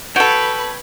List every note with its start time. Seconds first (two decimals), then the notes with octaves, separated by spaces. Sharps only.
0.16 F#4 A4 B4 C#5 G5 B5